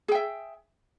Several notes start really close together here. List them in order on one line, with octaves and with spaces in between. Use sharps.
G#4 G5 E5